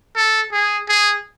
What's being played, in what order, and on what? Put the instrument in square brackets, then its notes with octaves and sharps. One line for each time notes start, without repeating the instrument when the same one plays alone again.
[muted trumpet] A4
G#4
G#4